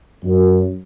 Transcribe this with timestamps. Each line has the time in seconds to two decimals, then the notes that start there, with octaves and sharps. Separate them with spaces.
0.23 F#2